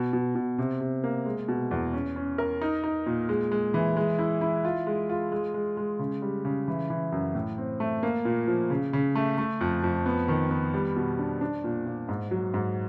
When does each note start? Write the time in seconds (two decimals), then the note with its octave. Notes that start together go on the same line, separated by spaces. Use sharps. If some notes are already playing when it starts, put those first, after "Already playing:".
Already playing: B2
0.13 B2
0.35 B2
0.58 C3
0.80 C3
1.04 A#3
1.26 G#3
1.48 B2
1.71 E2
1.93 C#4
2.16 C#4
2.38 A#4
2.61 D#4
2.84 D#4
3.06 A#2
3.29 G#3
3.52 G#3
3.74 E3
3.97 G#3
4.19 E4
4.41 E4
4.65 F4
4.87 G#3
5.10 F4
5.32 G#3
5.54 G#3
5.77 G#3
5.99 C#3
6.22 G3
6.45 C#3
6.68 E3
6.90 E3
7.12 F#2
7.35 A2
7.58 C4
7.80 A3
8.03 A#3
8.25 A#2
8.47 F3
8.70 C#3
8.93 C#3
9.15 A3
9.38 A3
9.61 F2
9.83 F2
10.06 B3
10.28 D#3
10.51 B3
10.74 G3
10.96 B2
11.19 D4
11.41 D4
11.64 A#2
11.86 A#2
12.09 G#2
12.31 F#3
12.54 G#2